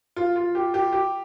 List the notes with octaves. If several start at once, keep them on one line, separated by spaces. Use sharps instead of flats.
F4
F4
G4
G4
G4